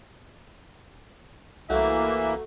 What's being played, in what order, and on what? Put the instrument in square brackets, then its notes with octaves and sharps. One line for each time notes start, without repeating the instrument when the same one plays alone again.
[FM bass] C2 [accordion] E3 A#3 [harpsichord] A3 F#4 [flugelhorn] E5